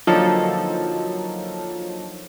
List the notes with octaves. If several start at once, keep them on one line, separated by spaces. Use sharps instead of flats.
D3 F3 F#3 A#3 D#4 A4